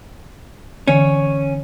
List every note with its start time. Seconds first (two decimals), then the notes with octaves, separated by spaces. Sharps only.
0.87 D3 E3 C#4